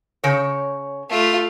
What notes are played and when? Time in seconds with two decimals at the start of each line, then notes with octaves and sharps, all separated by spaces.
0.24 C#3 C#5
1.10 A3 F4